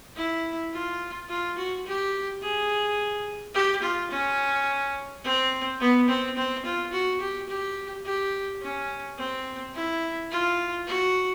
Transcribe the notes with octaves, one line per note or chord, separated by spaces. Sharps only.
E4
F4
F4
F#4
G4
G#4
G4
F4
C#4
C4
B3
C4
C4
F4
F#4
G4
G4
G4
C#4
C4
E4
F4
F#4